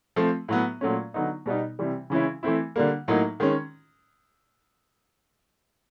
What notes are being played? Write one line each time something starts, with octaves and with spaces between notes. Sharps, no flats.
F3 A3 C4
A2 F#3 B3
A#2 F#3 A3 C#4
D3 F#3 B3 D#4
B2 G3 B3 D#4
C3 E3 G3
C#3 E3 G#3 C#4 E4
E3 A3 C4 E4
D3 G3 A#3
A2 F#3 A#3 D#4
D#3 G#3 C#4